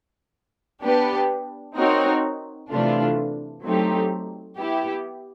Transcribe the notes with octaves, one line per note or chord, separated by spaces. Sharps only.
B3 D4 G4 B4
C4 D#4 F#4 A#4 C#5
C3 E3 A3 D4 F4
F#3 A3 C4 D#4 G4
B3 E4 G4